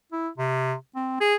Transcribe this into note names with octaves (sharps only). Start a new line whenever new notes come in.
E4
C3
C4
G#4